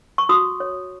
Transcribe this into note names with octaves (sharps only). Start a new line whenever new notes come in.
C#6
F#4 D#6
C#5